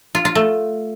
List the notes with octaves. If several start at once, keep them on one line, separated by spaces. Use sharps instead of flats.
F4
F4
A3